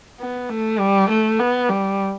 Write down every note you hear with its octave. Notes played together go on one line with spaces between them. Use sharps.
B3
A3
G3
A3
B3
G3